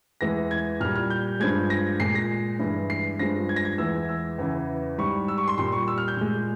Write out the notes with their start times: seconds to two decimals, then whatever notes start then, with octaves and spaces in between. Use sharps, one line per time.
0.21 E2 E3 G#3 A#6
0.51 G#6
0.80 A#2 G3 F6
0.96 F6
1.10 G6
1.40 G2 F3 G#3 G#6
1.70 A#6
2.00 A#2 G#3 C7
2.15 A#6
2.59 G2 E3 G#3
2.90 C7
3.19 G2 F3 G#3 A#6
3.49 G#6
3.56 A#6
3.65 G#6
3.78 E2 E3 G#3 E6
4.09 E6
4.38 E2 C#3 E3
4.98 G#2 G3 C#6
5.28 E6
5.38 C#6
5.48 C6
5.58 A#2 G3 C6
5.72 C#6
5.88 E6
5.98 F6
6.08 G6
6.17 A#2 G#3